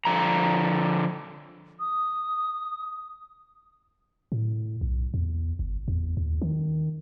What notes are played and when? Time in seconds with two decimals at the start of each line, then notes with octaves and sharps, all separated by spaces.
0.05 D3 F3 A#5
1.80 D#6
4.32 A2
4.81 B1
5.14 E2
5.59 G1
5.88 E2
6.17 D#2
6.42 D#3